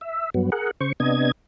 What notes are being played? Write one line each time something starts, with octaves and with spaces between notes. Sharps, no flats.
E5
G2 F#3 B3
G#4 A#4 F#5
C#3 C5 C#6
C3 B3 D4 D#5 G#6